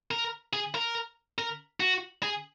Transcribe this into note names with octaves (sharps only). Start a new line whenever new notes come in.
A#4
G#4
A#4
A#4
F#4
G#4